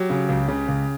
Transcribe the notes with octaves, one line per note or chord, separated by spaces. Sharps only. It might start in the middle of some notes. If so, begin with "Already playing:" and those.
Already playing: F#3 G4
C#3
C#2
C#3
C#2